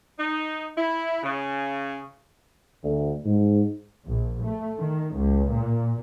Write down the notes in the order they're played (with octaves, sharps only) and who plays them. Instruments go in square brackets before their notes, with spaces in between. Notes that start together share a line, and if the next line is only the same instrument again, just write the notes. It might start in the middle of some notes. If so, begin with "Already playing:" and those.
[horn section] D#4
E4
C#3
[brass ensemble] D2
G#2
[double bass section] A#1
A3
D#3
C#2
A#2